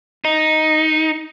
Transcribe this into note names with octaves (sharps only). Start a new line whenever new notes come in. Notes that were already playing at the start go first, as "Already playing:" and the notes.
D#4